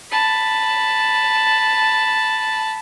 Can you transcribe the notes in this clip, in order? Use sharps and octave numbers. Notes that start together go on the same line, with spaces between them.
A5 B5